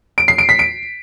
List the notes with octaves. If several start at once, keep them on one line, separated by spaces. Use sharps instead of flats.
D7
C7
D7
B6
D7